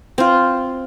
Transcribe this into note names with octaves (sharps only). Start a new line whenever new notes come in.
C4 F4